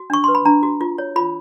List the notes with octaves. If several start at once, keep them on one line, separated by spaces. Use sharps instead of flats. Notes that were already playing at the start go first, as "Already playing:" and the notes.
Already playing: F#4
D4 C#6
B4 C6
B5
D4 A#5
F#4
F4
C#5
F4 B5